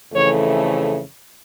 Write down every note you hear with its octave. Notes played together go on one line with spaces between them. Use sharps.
F2 C#3 E3 A3 C#5